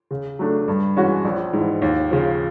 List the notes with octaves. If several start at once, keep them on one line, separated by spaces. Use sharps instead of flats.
C#3
F#3 A3 D4
G2
E3 G#3 C#4 F#4
A#1
G#2 E3
D#2
C#3 F3